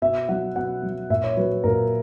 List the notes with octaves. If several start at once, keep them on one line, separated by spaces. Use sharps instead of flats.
B2 E5
F#3 F#5
B2 F#5
F#3
A#2 E5
C#5
F#3 B4
A#2 A#4